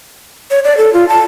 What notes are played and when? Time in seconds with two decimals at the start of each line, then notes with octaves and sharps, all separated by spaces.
0.51 C#5
0.65 D5
0.77 A4
0.93 F4
1.09 A5